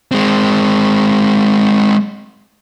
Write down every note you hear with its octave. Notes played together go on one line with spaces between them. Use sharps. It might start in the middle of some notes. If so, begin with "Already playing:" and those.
G#3 C4